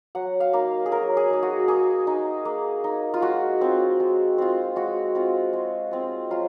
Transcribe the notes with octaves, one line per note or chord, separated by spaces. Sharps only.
F#3 F#5
F5
A#3 D#4
G#4
F#3 A#4
G#4
A#3 D#4
F#4
A#3 G#4
D#4
A#3
D#4
F4
G#3 F#4
C4 F4
G#3
C4 F4
G#3 F#4
C4 F4
G#3
C4 F4
F#3 F4